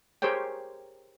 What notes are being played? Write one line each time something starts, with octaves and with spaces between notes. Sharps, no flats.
G4 G#4 A#4 C5 C#5 G5